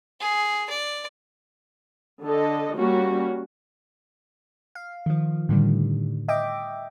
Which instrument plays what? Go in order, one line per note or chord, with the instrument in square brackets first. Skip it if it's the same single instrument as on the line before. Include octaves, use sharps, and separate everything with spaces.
[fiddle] G#4
D5
[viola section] D3 A4 D#5
G3 A#3 C#4 F#4
[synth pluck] F5
D#3 F3
A2 D3 D#3 G3
D#5 E5 G5 D6